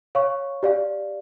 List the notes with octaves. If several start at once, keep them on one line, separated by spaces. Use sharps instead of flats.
C#5 F5 C#6
G4 D5 F5